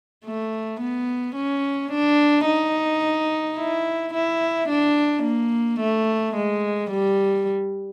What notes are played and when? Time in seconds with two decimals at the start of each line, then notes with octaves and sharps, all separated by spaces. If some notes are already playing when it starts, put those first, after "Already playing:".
0.25 A3
0.80 B3
1.35 C#4
1.91 D4
2.46 D#4
3.58 E4
4.13 E4
4.68 D4
5.24 A#3
5.80 A3
6.35 G#3
6.90 G3